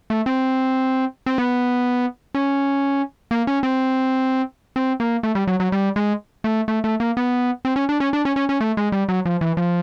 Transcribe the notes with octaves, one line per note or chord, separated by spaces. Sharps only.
A3
C4
C4
B3
C#4
A#3
C#4
C4
C4
A#3
A3
G3
F#3
F#3
G3
G#3
A3
A3
A3
A#3
B3
C4
C#4
D4
C#4
D4
C#4
C#4
C#4
A3
G#3
G3
F#3
F3
E3
F3